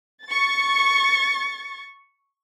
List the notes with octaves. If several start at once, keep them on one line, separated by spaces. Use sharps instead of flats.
C#6 A6